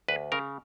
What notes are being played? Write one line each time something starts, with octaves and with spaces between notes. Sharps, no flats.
D2 B4
C#3 A#4